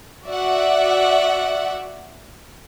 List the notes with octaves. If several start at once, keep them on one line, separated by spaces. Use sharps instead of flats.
F#4 D5 E5 F#5